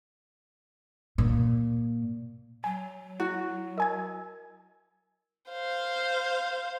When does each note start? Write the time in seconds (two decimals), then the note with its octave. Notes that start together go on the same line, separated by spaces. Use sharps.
1.18 A#2
2.64 F#3 G#5
3.20 E4 F#4
3.78 A#4 D#5 G#5 G#6
5.51 C5 F5